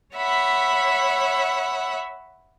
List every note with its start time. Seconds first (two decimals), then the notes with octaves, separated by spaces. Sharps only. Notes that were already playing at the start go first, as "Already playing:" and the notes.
0.15 C#5 E5 F#5 B5